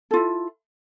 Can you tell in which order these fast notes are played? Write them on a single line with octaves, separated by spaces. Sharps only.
A4 F4 E4